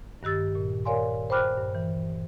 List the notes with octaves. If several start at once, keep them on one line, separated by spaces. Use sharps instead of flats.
G2 D#3 G4 E6 A6
A#2
A#4 C#5 D5 F5 G#5 C6
C5 G5 B5 D6 F6 F#6
G2
E3